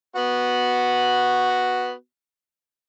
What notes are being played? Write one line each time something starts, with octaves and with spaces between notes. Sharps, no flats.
B3 F#4